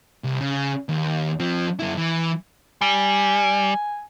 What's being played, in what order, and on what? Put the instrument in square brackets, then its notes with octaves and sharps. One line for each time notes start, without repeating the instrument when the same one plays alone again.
[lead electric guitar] C2
C#3
D#2
F3 C4
F#2 E4
E3
[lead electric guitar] G3 [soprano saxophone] G#5